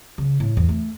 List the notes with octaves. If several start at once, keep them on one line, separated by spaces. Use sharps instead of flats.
C#3
A2
E2
A3